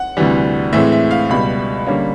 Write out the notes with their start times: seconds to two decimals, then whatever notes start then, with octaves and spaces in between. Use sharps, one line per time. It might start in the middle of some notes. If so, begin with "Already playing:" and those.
Already playing: F#5
0.17 D2 C3 E3 G3
0.73 A2 E3 G#3 C4 E5
0.92 E5
1.11 F5
1.29 C#2 B2 G3 B5
1.86 D3 G3 A#3 C#4